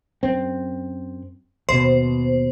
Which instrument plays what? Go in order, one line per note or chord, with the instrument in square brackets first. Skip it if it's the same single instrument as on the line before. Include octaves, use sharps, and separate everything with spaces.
[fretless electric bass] F#2 C4
[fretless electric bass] D#2 B2 [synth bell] C5